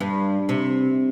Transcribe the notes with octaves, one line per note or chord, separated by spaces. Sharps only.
G2
C3